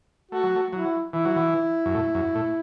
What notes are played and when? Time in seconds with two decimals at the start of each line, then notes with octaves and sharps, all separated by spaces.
0.31 A3 F#4
0.43 F#3
0.56 A3
0.72 F#3 E4
1.13 E3 E4
1.25 F#3
1.36 E3
1.85 F#2
1.95 A2
2.15 F#2
2.35 A2